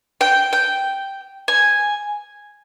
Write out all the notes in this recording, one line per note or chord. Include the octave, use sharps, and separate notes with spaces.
G5
G5
G#5